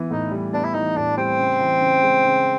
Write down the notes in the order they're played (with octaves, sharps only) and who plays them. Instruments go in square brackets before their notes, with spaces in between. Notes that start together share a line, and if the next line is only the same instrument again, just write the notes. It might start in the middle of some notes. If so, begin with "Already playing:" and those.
Already playing: [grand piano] E3 B3
[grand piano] A2 [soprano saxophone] D#4
[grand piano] G3
[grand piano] B3 [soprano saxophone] D4
[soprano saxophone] E4
[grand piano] E3 [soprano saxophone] D#4
[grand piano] A2 [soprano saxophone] D4
[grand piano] G3 [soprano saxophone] C4
[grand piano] C#3
E3
C#3
G#3
C#3